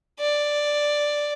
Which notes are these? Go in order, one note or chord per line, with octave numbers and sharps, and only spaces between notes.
D5